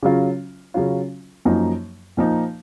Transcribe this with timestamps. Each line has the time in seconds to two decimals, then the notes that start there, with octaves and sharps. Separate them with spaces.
0.03 C#3 F#3 C#4 F4
0.74 C#3 F#3 C#4 F4
1.45 F#2 F3 A#3 D#4
2.17 A#2 F3 A#3 D#4